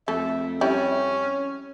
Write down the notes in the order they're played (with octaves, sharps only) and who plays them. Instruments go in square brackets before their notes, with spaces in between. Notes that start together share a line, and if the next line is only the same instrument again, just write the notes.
[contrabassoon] F2 [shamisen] A3 [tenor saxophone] E5
[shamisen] G3 E4 [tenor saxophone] C#4